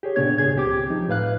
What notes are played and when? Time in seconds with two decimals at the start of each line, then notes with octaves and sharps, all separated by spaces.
0.03 G4 G#4 C#5
0.16 A#2 C#3 B3 D4 C#5 G#6
0.38 G#2 G#4 G#6
0.55 C#2 C4 G4 D6
0.90 F3 D#4
1.08 A2 B4 F5 F#6